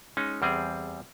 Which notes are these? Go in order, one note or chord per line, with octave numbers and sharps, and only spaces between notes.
G#3 C#4 D#4
E2 G3 C4 G#4